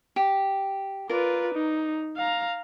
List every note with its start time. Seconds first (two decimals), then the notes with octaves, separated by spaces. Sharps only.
0.16 G4
1.09 F4 A#4 B4 D5
1.54 D#4
2.16 F5 A#5